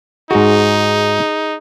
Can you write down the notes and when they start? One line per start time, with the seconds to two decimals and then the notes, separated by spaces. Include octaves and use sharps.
0.31 G#2 D#4 F#4 G#4